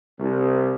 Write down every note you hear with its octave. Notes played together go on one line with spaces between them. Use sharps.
C2